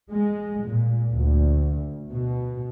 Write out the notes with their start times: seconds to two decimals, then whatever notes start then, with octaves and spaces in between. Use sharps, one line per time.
0.11 G#3
0.67 A#2
1.14 D2
2.12 B2